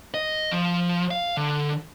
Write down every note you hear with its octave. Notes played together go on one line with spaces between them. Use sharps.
D#5
F3
F5
D3